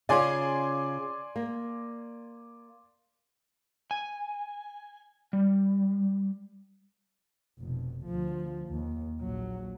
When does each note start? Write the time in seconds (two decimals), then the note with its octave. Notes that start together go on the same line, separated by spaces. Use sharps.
0.09 C#3 C#4 F4 D5 G#5 C6
1.36 A#3
3.91 G#5
5.33 G3
7.59 F1 B2
8.05 D2 F3
8.68 D#2
9.21 A#1 F#3